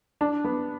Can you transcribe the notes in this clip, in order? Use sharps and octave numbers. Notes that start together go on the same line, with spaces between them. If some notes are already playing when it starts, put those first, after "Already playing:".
D4
B3